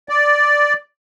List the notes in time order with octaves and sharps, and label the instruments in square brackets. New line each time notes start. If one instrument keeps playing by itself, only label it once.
[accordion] D5